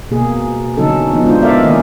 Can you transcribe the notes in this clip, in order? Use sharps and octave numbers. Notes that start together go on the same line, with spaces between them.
B2 A#3 G#4
D3 F#3 C#4 D#4 A4
F3 B3 D#4
G#3 D4 D#4 F4 C5
B3 A4 A#4 D5 E5 F5
D#3 A#3 C#4 D5 D#5